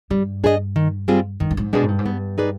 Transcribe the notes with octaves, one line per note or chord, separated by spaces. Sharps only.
G2 G3
D4 G#4 B4 D#5
D#3
G3 C4 F4 G#4
G2 D#3
G2
G#2
B2 G#3 D4 G#4
G#2
G2
G#2
G2 B3
D#4 G#4 B4 D5